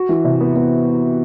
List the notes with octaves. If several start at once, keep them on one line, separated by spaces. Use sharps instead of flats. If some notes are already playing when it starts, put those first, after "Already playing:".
Already playing: F#4
E3
C3
B3
B3